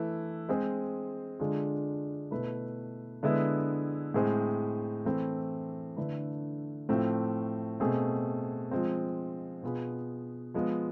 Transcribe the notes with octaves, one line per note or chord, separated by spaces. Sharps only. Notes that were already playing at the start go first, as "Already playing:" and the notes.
Already playing: E3 A3 E4 B4
G#3 C4 G#4 C5
D3 G#3 D4 F4 G#4
B2 A3 E4 B4
D3 G#3 B3 E4 B4
A2 G#3 C4 G#4 C5
E3 A3 C4 E4
D3 A3 E4 B4
A2 F3 A3 C4 F4
B2 A3 C4 G#4
F3 G#3 C4
B2 B3 F4 G#4 B4
F3 G#3 B3 F4